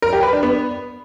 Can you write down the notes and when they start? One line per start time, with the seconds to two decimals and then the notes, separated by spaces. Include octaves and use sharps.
0.02 A#4
0.13 G4
0.23 B4
0.33 D4
0.43 B3